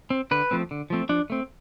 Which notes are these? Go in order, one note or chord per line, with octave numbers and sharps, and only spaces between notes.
C4
D3 B4
F3 A3 C4
D3
F3 A3 C4
F3 D4
A3 C4